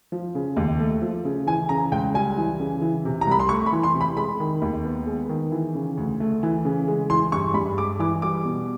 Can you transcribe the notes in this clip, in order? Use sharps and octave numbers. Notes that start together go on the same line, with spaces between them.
F3
C#3
D#2
A3
F3
C#3
E3 G#5
C#3 A#5
C#2 G5
G3 G#5
E3
C#3
E3
C3
A#5
C2 B5
C6
A3 C#6
B5
E3
C6
C3
B5
G#3 B5
D#3
D#2
B3
G#3
D#3
E3
C#3
D2
A3
E3
C#3
G#3
E3 C6
G2 C#6
G2 B5
G#3 D6
E3 D6
G3 D6
B2